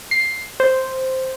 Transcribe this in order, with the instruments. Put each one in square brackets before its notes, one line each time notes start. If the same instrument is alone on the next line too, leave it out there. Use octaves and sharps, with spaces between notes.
[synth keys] C7
C5